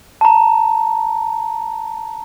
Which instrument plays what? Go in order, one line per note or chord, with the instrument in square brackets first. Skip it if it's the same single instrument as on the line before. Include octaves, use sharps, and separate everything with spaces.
[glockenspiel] A5 A#5